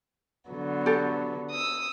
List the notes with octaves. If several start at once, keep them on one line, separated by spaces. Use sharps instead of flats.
D3 F#3 B3
G4 A4
D#6 E6